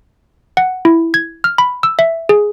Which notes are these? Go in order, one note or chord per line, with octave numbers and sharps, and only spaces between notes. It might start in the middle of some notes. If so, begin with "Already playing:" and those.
F#5
E4
G#6
F6
B5
E6
E5
G#4